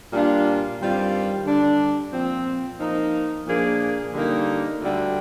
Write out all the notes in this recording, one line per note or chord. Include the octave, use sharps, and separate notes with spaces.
A#2 G3 D4 F4
G2 D#3 G3 C4 F4
D3 G3 D4
A#2 F3 C4
F3 A#3 D#4
A#2 F3 A#3 D4 G#4
D3 G3 A#3 D#4
D2 D3 G3